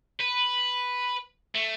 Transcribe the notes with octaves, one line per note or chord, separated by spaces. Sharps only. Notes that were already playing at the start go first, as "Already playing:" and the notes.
B4
A3